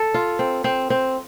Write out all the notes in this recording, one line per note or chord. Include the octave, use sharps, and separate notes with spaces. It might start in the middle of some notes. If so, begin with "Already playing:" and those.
Already playing: A4
F4
C4
C4
C4